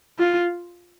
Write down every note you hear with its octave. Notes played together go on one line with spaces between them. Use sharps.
F4